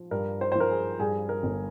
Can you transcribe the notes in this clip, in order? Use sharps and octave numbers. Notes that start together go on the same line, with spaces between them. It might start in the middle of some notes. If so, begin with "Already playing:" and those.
Already playing: F3
G2 A#4
C5
F3 C5
A#4
G#4
G2 G#4
A#4
G1